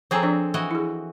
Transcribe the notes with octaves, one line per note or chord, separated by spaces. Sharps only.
F3 C4 G#4 A4 G#5 A#5
F3 D4 D5
E3 F#4 D#5
E4 G#4